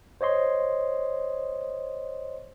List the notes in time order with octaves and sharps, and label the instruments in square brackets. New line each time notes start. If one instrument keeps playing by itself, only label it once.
[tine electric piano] C5 C#5 D#5 C6